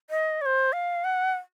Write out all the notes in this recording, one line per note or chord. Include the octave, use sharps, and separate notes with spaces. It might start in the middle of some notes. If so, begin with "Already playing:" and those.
D#5
C#5
C5
F5
F#5